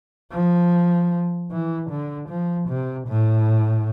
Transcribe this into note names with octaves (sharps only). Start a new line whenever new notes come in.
F3
E3
D3
F3
C3
A2